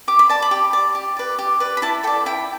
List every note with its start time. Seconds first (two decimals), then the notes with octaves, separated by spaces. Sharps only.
0.08 G4 D6
0.19 B5
0.29 D5 A5
0.42 B5
0.51 G4
0.73 D5
0.95 G4
1.17 B4 D5
1.39 G4
1.60 B4 D5
1.77 B5
1.82 E4 A5
2.03 A4 G5
2.07 D5
2.26 E4 G5